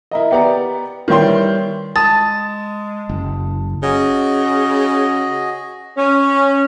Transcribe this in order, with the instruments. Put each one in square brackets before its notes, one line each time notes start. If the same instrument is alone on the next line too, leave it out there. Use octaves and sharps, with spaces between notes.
[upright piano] E4 A#4 D#5
B3 G4 D5 F#5 A#5
D#3 E3 G3 C#5 G5 C6
[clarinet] G#3 [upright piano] A5 D#6 [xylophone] A6
[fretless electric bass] F#1
[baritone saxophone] C#3 [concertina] F#4 G#4 D#5
[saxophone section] C#4